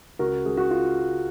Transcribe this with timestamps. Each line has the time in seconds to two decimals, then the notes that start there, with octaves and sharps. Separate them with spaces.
0.19 C#2 F#4 A#4
0.45 C#2 G#4
0.57 F#4
0.70 F4